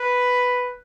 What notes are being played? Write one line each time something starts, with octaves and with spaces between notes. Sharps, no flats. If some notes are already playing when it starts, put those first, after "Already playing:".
Already playing: B4